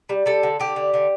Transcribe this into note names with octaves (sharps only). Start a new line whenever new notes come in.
G3
G3 A4
D3
D3 G4
D3
D3